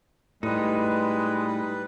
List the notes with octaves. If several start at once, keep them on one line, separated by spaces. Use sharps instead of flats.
A2 G3 G#3 D#4 B4